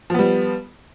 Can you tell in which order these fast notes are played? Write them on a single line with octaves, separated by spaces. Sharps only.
F3 B3 G3